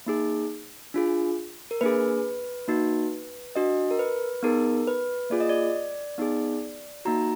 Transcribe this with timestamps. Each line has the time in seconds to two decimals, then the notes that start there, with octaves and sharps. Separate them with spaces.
0.06 A#3 D#4 G#4
0.94 D4 F4 G#4
1.71 A#4
1.81 A#3 D4 G#4 B4
2.68 A#3 D#4 F#4
3.56 D4 F#4 D#5
3.91 A#4
3.99 B4
4.43 B3 D#4 G#4 A#4
4.87 B4
5.30 A#3 F4 G#4 D5
5.40 D#5
5.49 D5
6.18 B3 D#4 G#4
7.05 A#3 D#4 F#4 A#5